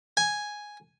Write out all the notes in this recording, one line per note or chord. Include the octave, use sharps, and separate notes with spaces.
G#5